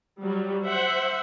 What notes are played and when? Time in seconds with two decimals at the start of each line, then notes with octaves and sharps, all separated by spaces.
0.21 F#3 G3
0.65 C5 E5 F#5